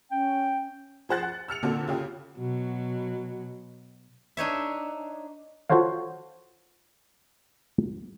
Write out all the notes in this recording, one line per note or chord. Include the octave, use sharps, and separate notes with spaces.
C#4 G5
F3 G#4 C5 F#5 F#6 A6
F#5
E6 F6 C#7 F7
A#2 D3 A#3 C4 F#4 A4
C#3 F4 G4
B2 F#3
D4 D#4 C#5 E5
F4 F#4 A4 C5 C#5 F5